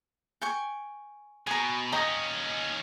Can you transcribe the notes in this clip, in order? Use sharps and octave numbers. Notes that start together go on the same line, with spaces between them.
G5 G#5 C#6
B2 G#5 A#5
D#2 C#4 D#5 G5 A#5